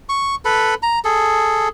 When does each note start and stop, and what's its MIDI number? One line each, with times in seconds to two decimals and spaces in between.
0.09 0.35 85
0.45 0.74 69
0.45 0.74 71
0.45 0.74 83
0.83 0.99 82
1.05 1.68 68
1.05 1.68 69